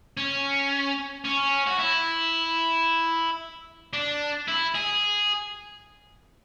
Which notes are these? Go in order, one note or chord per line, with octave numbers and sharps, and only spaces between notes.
C#4
C#4
F#4
E4
D4
E4
G#4